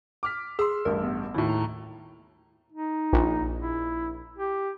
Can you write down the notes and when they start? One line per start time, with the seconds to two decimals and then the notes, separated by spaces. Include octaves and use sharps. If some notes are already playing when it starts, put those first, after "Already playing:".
0.23 D6 F6 B6
0.59 G#4 C6 E6
0.85 A1 G2 A#4
1.04 B3
1.34 D#2 A2 E4
1.49 A#5
2.73 D#4
3.13 A#1
3.59 E4
4.38 G4